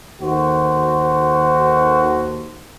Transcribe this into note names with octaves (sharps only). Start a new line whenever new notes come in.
D#2 D#3 F#4 A4 C5